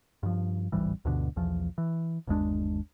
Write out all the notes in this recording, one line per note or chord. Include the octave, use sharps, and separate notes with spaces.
G2 F3
D1 G#1 E3 G3
D2 G2 B2 D3
B1 E2 F3
E3
G1 D#2 G#3 D4